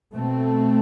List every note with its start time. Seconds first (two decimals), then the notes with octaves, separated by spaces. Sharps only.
0.14 B2 A3 C4